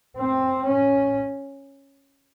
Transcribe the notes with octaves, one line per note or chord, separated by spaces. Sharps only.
C4
C#4